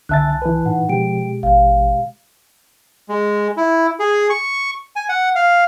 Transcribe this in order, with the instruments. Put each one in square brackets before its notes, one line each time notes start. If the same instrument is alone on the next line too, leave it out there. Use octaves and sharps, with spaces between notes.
[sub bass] C2 [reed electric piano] D3 E5 A6 [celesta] G#5 A5 F#6
[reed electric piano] E3 B4
[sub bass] A2 [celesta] D#4 F#5
[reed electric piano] B2 G#3 G4 [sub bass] F3 [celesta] G5 D7
[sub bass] A1 [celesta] F5
[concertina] G#3
E4
G#4
C#6
G#5
F#5
F5